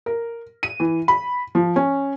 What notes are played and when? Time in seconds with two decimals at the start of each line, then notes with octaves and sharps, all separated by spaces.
0.06 A#4
0.63 D#7
0.80 E3
1.08 B5
1.55 F3
1.76 C#4